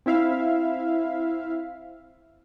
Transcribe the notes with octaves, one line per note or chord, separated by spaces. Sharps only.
C4 E4 E5 F5